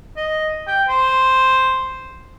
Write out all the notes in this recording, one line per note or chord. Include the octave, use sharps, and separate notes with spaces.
D#5
G5
C5